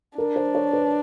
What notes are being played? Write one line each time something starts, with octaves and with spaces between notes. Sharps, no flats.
D4 A#4
C5
C#5
B4